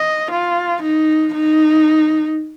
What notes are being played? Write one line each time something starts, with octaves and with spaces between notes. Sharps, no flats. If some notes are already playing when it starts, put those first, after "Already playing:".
Already playing: D#5
F4
D#4
D#4